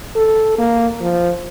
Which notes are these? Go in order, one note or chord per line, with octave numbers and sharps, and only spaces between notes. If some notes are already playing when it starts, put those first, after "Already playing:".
A4
A#3
F3